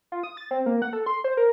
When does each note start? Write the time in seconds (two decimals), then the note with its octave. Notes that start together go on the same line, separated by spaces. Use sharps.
0.12 F4
0.23 D#6
0.37 A6
0.51 C4
0.66 A#3
0.82 F#5
0.93 A4
1.06 C6
1.24 C5
1.37 A#4